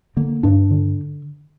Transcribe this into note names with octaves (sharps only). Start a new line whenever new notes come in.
D3 A#3
G2 D4
D3